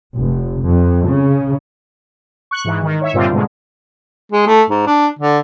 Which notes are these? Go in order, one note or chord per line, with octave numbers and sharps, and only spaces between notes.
F1
F2
C#3
C#6 F#6
G#2 E3
D#3
C#5 E5
G2 A#2 D3 G3 C4 F4
G#2 B2 D3 G#3
G#3
A3
G#2
D4
D3